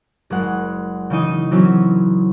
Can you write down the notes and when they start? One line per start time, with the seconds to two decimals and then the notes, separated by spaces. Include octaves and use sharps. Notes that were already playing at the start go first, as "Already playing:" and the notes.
0.30 F#1 G#3 F#5
1.10 C#3 E3 D#4 D#7
1.51 E3 F#3 C4 C#4